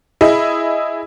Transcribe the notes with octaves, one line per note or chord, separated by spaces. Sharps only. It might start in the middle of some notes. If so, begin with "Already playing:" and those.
E4 G#4 D#5